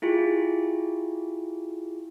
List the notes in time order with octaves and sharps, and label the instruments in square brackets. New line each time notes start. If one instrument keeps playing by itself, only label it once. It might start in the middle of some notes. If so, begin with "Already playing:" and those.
[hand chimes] E4 F4 G4 G#4